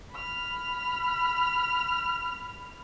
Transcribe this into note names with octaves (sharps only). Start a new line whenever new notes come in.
B5 F6